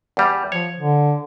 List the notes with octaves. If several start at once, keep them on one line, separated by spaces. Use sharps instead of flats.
E2 G3
F3 C#5
D3